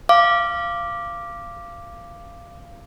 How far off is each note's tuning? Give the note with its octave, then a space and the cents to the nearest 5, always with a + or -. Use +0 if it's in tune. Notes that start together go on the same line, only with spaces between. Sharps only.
F5 -15 D6 +0